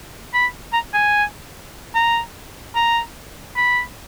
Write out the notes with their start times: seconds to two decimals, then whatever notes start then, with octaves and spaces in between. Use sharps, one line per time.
0.34 B5
0.73 A#5
0.94 G#5
1.95 A#5
2.75 A#5
3.57 B5